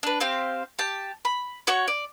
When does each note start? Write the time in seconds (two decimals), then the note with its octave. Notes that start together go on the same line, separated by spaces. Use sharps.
0.03 D4 B4
0.20 C4 G4 C5 F5
0.79 G4 A5
1.25 B5
1.67 F#4 C#5 F#5 C#6
1.88 D5